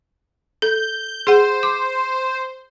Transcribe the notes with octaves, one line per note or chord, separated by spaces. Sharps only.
A4 G6
G#4 C5 F#5
D6